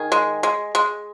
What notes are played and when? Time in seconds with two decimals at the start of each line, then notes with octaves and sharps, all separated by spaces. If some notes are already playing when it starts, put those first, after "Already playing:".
Already playing: D#3 G#4
0.12 G#3
0.43 G#3
0.75 G#3